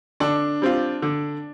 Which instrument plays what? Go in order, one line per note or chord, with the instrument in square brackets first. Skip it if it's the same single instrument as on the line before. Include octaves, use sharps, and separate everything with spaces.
[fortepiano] D3 [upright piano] D4
[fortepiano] G3 C4 F4
D3